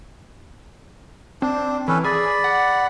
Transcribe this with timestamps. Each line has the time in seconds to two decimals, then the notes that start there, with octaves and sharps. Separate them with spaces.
1.42 C4 D4
1.88 E3 C#4 A4 B4
2.04 G#4 D5 B5
2.44 F#5